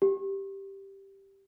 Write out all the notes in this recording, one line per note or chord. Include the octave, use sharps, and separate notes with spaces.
G4